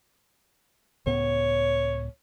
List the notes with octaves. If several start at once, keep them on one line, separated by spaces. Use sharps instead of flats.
C#2 A2 B3 C#5